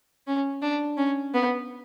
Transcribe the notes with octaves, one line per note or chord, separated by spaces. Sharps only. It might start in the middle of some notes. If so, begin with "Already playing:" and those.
C#4
D4
C#4
B3